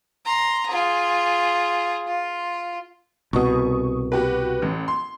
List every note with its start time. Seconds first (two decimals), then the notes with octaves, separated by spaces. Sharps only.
0.25 A#5 C6
0.68 F4 G#4
2.06 F4
3.33 C2 B2 C#6 D#6
4.12 F#4 G4 B4
4.62 A1
4.88 C6